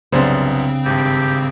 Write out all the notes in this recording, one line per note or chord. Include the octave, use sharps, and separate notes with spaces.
C2 F#2 C#3 B3 C4 D4 G#4 C5
G#1 G2 G4